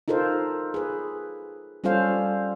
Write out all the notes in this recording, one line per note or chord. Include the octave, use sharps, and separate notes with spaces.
D#4 F4 A4 A#4 C5
G#4 B4
G3 C#4 F4 A4 C5 F5